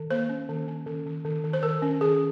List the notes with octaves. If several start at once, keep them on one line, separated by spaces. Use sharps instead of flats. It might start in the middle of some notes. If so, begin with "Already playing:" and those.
Already playing: D#3
A#3 C5
C#4
D#3
C#4
D#3
D#3
D#3
D#3
C5
D#3 A#4
C#4
D#3 G#4